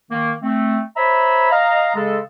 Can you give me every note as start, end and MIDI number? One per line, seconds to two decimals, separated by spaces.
0.11 0.32 51
0.11 0.32 58
0.42 0.79 57
0.42 0.79 60
0.96 1.50 72
0.96 1.50 73
0.96 1.50 76
0.96 1.50 82
0.96 1.50 83
1.51 1.92 75
1.51 1.92 77
1.51 1.92 82
1.95 2.18 49
1.95 2.18 56
1.95 2.18 69